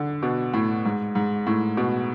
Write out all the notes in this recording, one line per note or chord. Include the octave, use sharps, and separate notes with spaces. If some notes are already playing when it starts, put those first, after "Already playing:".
Already playing: D3
B2
A2
G#2
G#2
A2
B2